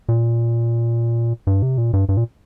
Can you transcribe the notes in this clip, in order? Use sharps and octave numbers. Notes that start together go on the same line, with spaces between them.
A#2
G2
C3
A#2
G2
G2
A#2